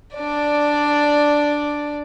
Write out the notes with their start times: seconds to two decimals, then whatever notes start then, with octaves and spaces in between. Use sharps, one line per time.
0.15 D4 D5